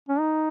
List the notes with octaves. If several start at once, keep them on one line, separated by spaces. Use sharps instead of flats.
C#4
D#4